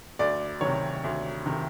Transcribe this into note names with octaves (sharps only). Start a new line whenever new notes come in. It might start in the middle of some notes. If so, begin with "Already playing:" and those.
D2 D5
C3 D#3 C#5
D2
C3 D#3